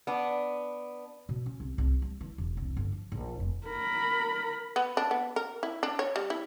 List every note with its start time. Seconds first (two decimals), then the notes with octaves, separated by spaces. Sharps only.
0.07 B3 D4
1.29 B2
1.46 C#4
1.60 C2
1.78 C2
2.02 G3
2.21 E3
2.38 E1
2.57 C2
2.77 G1
2.92 F3
3.12 A#1
3.40 F1
3.67 A#4 B5
4.76 B3
4.97 D4
5.11 B3
5.36 A#4
5.63 E4
5.83 D4
5.99 C#5
6.16 G3
6.30 E4